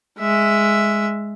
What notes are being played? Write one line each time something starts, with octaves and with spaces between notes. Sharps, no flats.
G#3 E5